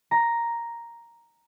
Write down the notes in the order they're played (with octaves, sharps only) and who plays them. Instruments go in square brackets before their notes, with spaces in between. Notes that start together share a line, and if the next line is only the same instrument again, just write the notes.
[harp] A#5